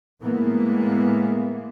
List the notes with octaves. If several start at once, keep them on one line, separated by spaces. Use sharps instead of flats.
A2 E3 G#3 A#3 B3